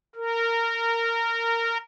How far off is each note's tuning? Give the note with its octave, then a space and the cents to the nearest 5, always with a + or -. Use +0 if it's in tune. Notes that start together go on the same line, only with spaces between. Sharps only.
A#4 -20